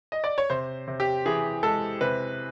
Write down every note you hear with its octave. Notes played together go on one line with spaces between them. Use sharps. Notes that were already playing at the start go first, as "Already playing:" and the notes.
D#5
D5
C#5
C3 C5
C3
G4
E3 G#4
G#3 A4
C3 B4